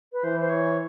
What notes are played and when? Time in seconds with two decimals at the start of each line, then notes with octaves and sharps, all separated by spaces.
0.13 B4
0.24 E3 C5
0.41 C5
0.50 C#5